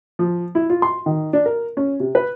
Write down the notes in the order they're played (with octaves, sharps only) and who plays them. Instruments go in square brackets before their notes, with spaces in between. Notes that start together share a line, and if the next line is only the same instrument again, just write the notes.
[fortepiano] F3
E4
F4
C6
D#3
D4
A#4
C#4
C3
B4